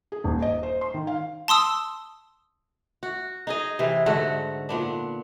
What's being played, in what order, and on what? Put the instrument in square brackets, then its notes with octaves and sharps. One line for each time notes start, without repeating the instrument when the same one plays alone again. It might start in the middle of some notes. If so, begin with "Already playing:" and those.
[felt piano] G#4
D#1
D#5
C5
C6
D#3
F5
[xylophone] A5 C6 D#6 E6
[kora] F#4
D#4 G#4 D#5
C3 E3
G#2 D3 A3 F#4
A#2 B3 D4